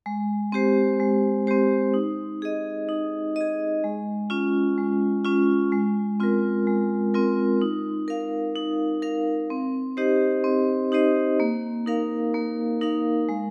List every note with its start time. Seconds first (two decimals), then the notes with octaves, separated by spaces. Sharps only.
0.06 G#3
0.52 C4 G4 C5
1.00 G#3
1.47 C4 G4 C5
1.94 D#4
2.42 G#4 D#5
2.89 D#4
3.36 G#4 D#5
3.84 G#3
4.30 C#4 F4
4.78 G#3
5.25 C#4 F4
5.72 G#3
6.20 C4 F4 A#4
6.67 G#3
7.14 C4 F4 A#4
7.62 D#4
8.08 A#4 F5
8.56 D#4
9.02 A#4 F5
9.50 C4
9.97 D#4 G4 C5 D#5
10.44 C4
10.92 D#4 G4 C5 D#5
11.40 A#3
11.86 D#4 A#4 F5
12.34 A#3
12.81 D#4 A#4 F5
13.29 G#3